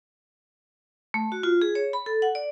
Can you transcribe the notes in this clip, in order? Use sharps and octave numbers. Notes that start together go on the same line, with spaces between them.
A3
F#4
F4
G#4
C#5
B5
A4
F#5
D5